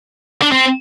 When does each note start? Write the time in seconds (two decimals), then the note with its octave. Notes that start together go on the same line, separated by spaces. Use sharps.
0.42 D4
0.52 C4